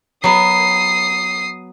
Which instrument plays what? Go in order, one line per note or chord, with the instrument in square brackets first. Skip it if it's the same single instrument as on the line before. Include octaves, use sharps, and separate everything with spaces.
[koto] F#3 B3 [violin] D#6 C7